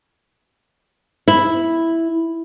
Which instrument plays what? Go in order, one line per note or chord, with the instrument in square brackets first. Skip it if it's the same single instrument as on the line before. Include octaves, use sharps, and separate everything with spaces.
[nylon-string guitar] E4